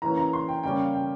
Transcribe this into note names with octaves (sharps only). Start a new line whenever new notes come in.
E3 A#3 C#4 A#5
A#5
C6
G5
C#3 G3 A#3 C#4 G5
F5
G5